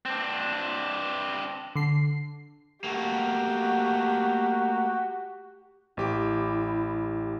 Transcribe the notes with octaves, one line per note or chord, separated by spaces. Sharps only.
C4 D4
D3 C7
A3 A#3 F#4 G4
A1 E4 G4 D6